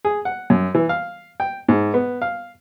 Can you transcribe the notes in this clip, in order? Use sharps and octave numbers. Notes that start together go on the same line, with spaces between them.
G#4
F#5
F#2
E3
F5
G5
G#2
B3
F5